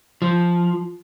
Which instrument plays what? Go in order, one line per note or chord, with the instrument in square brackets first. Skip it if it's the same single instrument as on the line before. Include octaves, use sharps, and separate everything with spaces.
[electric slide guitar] F3